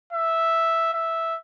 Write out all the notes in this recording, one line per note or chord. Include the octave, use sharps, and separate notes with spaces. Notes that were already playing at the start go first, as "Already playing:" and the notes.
E5
E5